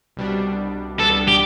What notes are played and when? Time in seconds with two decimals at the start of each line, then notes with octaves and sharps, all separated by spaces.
0.17 C2 B2 G3 D4
0.99 C2 B2 G3 B3 D4 A4
1.28 G4